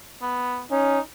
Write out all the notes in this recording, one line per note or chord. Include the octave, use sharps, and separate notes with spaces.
B3
C#4 D#4